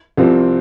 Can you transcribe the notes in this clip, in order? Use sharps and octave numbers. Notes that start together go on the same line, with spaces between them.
C2 C3 F3 C4